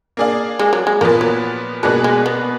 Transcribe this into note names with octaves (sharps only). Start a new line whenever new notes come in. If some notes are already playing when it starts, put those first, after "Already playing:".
A#3 D4 G#4 D5 F5
G#3
F#3
G#3
A#2 F3 A#3 B3
F#3
B2 G#3 A#3 D4 F#4 B4
G#3
B3